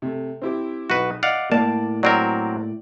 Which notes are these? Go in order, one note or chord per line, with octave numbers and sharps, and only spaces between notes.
C3 A3
C4 E4 G4
B1 F#4 B4
D5 D#5 F5 F#5
A2 A#3 D5 A5
F#3 C4 A#4 D5